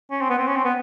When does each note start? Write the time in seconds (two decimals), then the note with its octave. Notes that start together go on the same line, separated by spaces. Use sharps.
0.11 C#4
0.21 C4
0.30 B3
0.38 C4
0.48 C#4
0.56 C4
0.65 B3